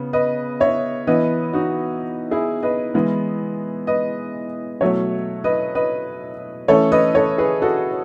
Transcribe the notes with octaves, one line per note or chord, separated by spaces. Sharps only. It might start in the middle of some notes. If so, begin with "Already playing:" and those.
Already playing: C#3 B3
B4 D#5
C#5 E5
E3 B3 B4 D#5
D#4 F#4
E4 G#4
B4 D#5
E3 G#3 B3
B4 D#5
B2 F#3 A3 C#5 E5
B4 D#5
B4 D#5
E3 A3 C#4 A4 C#5
B4 D#5
A4 C#5
G#4 B4
F#4 A4